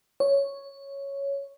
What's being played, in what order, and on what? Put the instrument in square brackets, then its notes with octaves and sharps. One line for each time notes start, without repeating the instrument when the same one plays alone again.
[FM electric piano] C#5